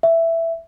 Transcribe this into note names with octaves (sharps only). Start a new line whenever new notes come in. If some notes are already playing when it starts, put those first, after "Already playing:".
E5